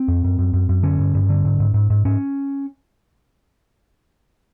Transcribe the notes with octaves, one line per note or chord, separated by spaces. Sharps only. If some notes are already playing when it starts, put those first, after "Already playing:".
Already playing: C4
F2
F#2
F#2
F#2
F#2
D3 C#4
G2
G2
D3
G#2
G#2
G#2
G#2
G#2 C#4